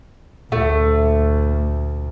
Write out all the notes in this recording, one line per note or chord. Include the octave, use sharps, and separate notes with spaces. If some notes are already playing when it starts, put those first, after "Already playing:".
D2 A#2 A3